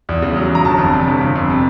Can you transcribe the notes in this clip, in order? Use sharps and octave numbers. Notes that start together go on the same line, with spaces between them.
E2
C#3
F#3
E2
A#5
G1 A5
F2
C3
G1
G1
F2
C3